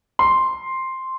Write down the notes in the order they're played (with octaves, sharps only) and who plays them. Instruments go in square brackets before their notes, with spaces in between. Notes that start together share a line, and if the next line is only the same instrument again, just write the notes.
[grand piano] C6